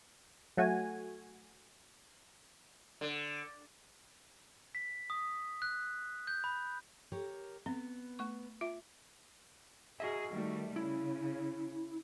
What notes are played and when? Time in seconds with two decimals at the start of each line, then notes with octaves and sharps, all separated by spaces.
0.57 F#3 A3 F#4 G#5
3.01 D3
4.75 B6
5.10 D#6
5.62 F#6
6.27 G6
6.44 B5
7.12 G4 A#4 C#5
7.66 B3 C4
8.19 A3 C#6
8.61 F4 E5
10.00 F#4 G#4 D#5 E5
10.31 D#3 G3 A3
10.76 C#3 E4